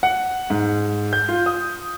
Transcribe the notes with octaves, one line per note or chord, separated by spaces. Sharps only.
F#5
G#2
G6
F4
D#6